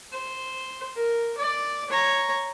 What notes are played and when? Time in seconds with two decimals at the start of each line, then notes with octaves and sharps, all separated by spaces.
0.12 C5
0.96 A#4
1.38 D5
1.90 C#5 A#5